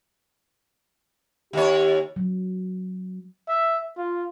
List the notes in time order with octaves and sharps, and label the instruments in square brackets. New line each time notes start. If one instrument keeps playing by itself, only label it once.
[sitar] D#2 C#5 [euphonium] G4
[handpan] F#3
[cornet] E5
F4